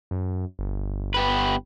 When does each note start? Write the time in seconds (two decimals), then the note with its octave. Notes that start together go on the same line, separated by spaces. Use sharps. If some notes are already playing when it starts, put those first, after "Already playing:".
0.11 F#2
0.59 G1
1.14 B3 G4 B4